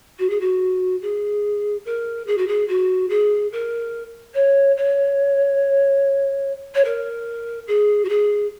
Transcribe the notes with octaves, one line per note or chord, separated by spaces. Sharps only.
F#4
G#4
F#4
G#4
A#4
G#4
F#4
G#4
F#4
G#4
A#4
C#5
C#5
C#5
A#4
G#4
F#4
G#4